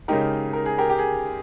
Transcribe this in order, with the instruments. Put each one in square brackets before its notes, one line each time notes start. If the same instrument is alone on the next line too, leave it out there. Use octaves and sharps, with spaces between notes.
[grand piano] C#3 G#3 D#4 [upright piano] G4 A#4
[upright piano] A#4
G#4
G4 A#4
G4
G#4